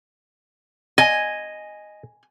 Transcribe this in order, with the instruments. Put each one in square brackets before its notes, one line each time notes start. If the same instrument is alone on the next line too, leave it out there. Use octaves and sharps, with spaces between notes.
[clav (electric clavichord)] D#5 [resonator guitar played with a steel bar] G#5